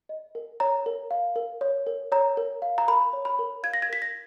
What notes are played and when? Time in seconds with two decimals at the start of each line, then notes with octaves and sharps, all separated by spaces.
0.09 D#5
0.35 A#4
0.60 C#5 A#5
0.86 A#4
1.11 F5
1.36 A#4
1.61 C#5
1.87 A#4
2.12 C#5 A#5
2.37 A#4
2.62 F5
2.78 A#5
2.88 A#4 B5
3.13 C#5
3.25 B5
3.39 A#4
3.63 F5 G#6
3.73 A#6
3.82 G#6
3.89 A#4 B6
4.02 A#6